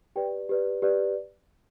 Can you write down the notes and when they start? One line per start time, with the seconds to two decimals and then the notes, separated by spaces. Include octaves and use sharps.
0.16 G4 B4 D5 G5
0.49 G4 B4 D5
0.82 G4 B4 D5